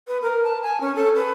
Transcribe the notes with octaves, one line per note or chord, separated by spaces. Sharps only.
B4
A#4
A5
G#5
C#4
A4
B4